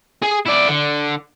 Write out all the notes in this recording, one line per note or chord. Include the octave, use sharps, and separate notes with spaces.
G#4 G#5
E4 D5
D3